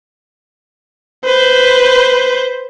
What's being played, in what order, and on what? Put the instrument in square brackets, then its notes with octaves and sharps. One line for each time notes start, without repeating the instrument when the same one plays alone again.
[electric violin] B4 C5